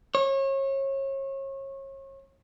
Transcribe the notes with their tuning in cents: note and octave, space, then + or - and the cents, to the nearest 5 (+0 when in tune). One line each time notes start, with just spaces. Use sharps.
C#5 -30